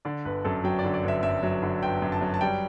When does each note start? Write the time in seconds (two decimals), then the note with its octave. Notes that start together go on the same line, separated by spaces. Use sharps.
0.05 D3 D5
0.25 G1 B4
0.45 F#2 A4
0.64 F#3 G5
0.79 D5
0.85 D3
0.94 D5
1.03 G1 E5
1.23 F#2 E5
1.43 F#3
1.63 D3
1.83 G1 G5
2.02 F#2
2.12 A5
2.21 F#3
2.34 A5
2.41 G3 G5